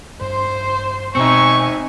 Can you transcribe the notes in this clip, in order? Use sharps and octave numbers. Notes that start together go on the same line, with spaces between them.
G2 C5 C6
B2 C4 D#4 E5 G#5 C#6 E6 C#7